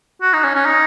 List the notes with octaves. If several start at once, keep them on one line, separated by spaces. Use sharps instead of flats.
F#4
D#4
C#4
C#4
D#4